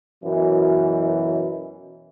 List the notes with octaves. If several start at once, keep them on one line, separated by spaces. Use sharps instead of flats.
F#2 B2 E3